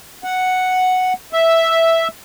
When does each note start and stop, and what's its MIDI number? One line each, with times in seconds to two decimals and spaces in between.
0.24 1.13 78
1.33 2.08 76